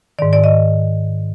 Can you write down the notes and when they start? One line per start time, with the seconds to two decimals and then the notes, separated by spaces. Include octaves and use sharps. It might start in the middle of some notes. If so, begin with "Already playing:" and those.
0.19 G#2 D#3 D5
0.33 D5
0.44 D#5